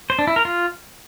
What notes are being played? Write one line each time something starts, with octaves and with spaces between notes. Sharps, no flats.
C5
D4
E4
A#4
F4